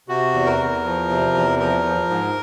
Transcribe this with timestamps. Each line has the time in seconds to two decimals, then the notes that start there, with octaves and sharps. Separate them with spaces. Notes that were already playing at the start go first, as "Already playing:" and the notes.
0.08 C3 F#4
0.33 E2
0.46 A#4
0.59 E2
0.84 F3
1.09 C3
1.34 E2
1.59 F3 A#4
1.84 F3
2.09 G#2